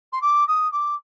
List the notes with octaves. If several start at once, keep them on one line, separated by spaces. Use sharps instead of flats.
C6
D6
D#6
D6